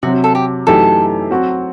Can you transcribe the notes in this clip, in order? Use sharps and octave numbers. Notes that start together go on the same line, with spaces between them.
C3 F#3 C4 F#4
A4
G4
F#2 E3 A3 D#4 G4 A4
F#3 C4 F#4